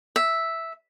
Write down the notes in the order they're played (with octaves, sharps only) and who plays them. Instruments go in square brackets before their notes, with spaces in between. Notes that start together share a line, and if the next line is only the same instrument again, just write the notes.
[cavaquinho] E5